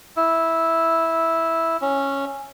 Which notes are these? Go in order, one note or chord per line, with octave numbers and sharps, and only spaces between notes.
E4
C#4